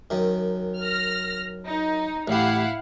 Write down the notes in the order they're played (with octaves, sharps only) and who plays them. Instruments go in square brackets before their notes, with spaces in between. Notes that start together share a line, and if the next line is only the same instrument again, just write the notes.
[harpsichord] F#2 D#3
[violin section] F6 A#6
D#4
[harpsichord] A1 G4 [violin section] E4 F5 F#5